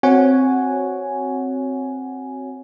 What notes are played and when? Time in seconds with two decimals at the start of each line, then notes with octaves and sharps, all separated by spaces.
0.03 C4 F#4 C#5 F#5 G#5